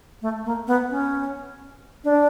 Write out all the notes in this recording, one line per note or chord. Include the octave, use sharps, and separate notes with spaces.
A3
A#3
B3
C#4
D4